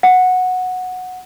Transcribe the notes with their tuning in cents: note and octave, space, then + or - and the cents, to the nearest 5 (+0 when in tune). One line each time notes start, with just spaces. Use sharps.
F#5 -10